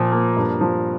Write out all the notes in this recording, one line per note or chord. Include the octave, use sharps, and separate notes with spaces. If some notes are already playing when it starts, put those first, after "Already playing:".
Already playing: A#2 F3
A#3
G2
F3